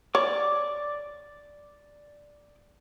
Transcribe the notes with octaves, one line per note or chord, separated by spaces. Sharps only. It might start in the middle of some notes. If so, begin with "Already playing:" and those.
C#5 D5 D6